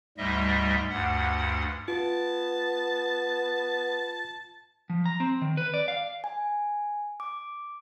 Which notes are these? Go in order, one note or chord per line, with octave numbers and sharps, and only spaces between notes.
D2 G#2 G3 D#5 E5
D2 G2 F#5
B3 F4 A5
F3
A#5
C4
D#3
B4
D5
F5
G#5
D6